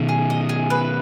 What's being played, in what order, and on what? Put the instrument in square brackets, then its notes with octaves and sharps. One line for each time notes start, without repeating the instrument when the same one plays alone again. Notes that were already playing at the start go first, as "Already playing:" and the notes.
Already playing: [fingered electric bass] B2 D#3
[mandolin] G#4
D#5
G#4
B4